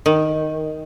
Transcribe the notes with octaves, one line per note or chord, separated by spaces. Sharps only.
D#3